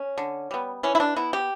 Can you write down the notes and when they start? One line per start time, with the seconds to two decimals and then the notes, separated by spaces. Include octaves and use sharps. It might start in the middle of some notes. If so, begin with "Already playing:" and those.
Already playing: C#4
0.18 D3
0.51 G3 B3
0.83 E3 C#4
0.95 E4
1.00 D4
1.16 B3 E4
1.33 G4